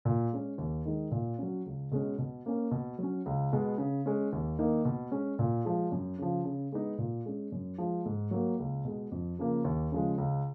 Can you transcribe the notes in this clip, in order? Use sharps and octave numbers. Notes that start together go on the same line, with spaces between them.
A#2
G#3 C#4
D#2
D#3 G#3 D#4
A#2
F#3 C#4
C#2
B2 G#3 C#4
B2
A#3 C#4
B2
F#3 C#4
C#2
B2 G#3 B3
C#3
G#3 C#4
D#2
D#3 A#3 D#4
B2
G#3 C#4
A#2
F3 G#3
F#2
C#3 F3
C#3
G#3 B3 D#4
A#2
G#3 C#4
F#2
F3 G#3
G#2
F#3 A#3
C#2
B2 G#3
F2
C#3 F3 A#3
D#2
C#3 F3 G#3
C#2